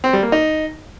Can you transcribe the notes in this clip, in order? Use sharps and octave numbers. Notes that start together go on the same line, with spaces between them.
C4
G3
A#3
D#4